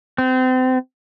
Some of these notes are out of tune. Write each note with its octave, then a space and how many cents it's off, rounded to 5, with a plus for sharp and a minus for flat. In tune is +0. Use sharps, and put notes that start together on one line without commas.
C4 -30